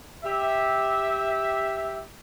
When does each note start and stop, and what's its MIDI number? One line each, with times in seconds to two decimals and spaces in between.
0.25 2.02 67
0.25 2.02 76